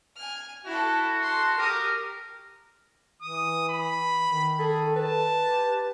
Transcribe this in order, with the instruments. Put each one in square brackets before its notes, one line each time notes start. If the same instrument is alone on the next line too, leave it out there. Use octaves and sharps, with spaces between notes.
[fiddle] G#5 F6
[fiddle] E4 A4 [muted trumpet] F#4
[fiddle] A4 C6
[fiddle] G4 D#6 [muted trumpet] A#4
[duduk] E3 [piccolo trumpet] D#6
[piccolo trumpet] B5
[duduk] D#3
[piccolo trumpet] G#4 [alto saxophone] A4
[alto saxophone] B4 [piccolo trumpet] A5
[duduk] G4